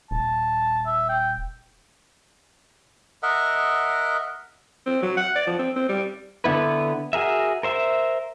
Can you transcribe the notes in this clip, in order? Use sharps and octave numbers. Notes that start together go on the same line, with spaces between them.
D#1 A5
E5
G5
A#4 D#5 E5 F#5
C4
F#3
F#5
D5
F3
C4
C4
G3
D3 B3 E4 B4
F#4 G#4 A#4 E5
A#4 C5 E5